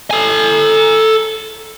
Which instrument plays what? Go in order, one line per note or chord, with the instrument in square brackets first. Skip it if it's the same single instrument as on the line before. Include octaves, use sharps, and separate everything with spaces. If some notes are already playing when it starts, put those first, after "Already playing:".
[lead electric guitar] A4 G#5